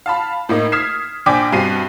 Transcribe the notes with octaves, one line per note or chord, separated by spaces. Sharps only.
F5 A5 B5
A2 A#3 D#4
D#6 F6 G#6 B6 C7 E7
A#1 D4 G5 G#5 D6 B6
G2 B2 C4 C7 D#7